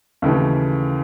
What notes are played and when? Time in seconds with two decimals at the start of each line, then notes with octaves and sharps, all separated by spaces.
0.22 D#2 C#3 E3 A3